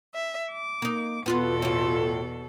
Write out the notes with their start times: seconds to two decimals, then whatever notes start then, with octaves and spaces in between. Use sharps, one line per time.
0.15 E5
0.51 D6
0.82 A#3 D#4
1.26 E2 B2 B3 F4 A4 B4
1.62 A2 F4